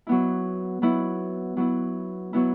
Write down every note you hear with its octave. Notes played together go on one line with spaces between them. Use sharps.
F#3 B3 E4
F#3 B3 E4
F#3 B3 E4
F#3 B3 E4